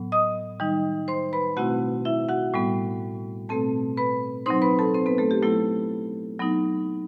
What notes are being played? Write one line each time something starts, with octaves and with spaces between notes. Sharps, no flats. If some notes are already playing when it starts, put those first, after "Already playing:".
Already playing: A2 F#3 B3
D#5 D#6
D#3 G3 D#4
C5 C6
B4 B5
B2 A3 C4 E4 F#4 F#5
E4 E5
F#4 F#5
A2 G3 B3
B2 A3 C4 A4 A5
B4 B5
F#3 C4 D#4 C5 C6
B4 B5
A4 A5
C4 C5
B3 B4
A3 A4
G4
F#3 A3 B3 E4 A4
F#3 B3 D#4